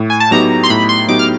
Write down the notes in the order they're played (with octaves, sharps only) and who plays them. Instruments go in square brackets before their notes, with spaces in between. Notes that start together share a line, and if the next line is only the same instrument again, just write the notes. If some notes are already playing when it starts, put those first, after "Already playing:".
Already playing: [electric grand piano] A2
[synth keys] G#5
A5
[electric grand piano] F#3 B3 D#4 G4 [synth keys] A#5
[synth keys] C6
[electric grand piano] A2 [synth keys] B5
[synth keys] C6
[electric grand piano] F#3 B3 D#4 G4 [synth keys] D6
[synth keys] F6